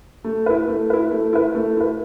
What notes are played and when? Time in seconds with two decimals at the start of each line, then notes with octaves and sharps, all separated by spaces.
0.24 A3
0.46 E4 B4
0.68 A3
0.90 E4 B4
1.11 A3
1.33 E4 B4
1.55 A3
1.77 E4 B4